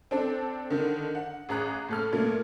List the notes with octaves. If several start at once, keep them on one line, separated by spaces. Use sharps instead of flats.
C4 D4 A4
D3 D#3
F#5
A1 G#4 A#5 F#6
A2 A4 F6
A#2 A3